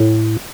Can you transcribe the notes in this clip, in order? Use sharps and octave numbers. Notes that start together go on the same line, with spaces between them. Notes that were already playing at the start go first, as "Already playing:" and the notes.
Already playing: A2